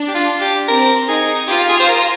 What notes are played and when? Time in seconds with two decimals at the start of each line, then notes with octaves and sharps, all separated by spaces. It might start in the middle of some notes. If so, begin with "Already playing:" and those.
Already playing: D4
0.08 G4
0.14 F4
0.41 G4
0.68 C4 A#4
1.08 D#4 G#4
1.48 F4 G4
1.69 G#4
1.80 C5
1.89 A#4